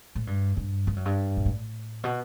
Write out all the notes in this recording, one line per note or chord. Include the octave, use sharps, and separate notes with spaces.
A2
G2
G2
G2
F#2
G2
B2
A2
B2